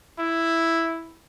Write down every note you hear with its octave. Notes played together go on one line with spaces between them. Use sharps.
E4